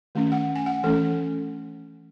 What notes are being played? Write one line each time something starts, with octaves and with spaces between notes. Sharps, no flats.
D#3 A3 C#4
F#5
G#5
F#5
E3 A3 C#4 A4